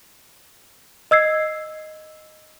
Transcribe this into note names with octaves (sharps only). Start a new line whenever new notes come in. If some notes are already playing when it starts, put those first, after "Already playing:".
D#5 E6 G#6 C7